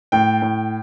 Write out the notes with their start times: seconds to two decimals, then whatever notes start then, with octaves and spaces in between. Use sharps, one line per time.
0.12 A2 G5
0.42 A2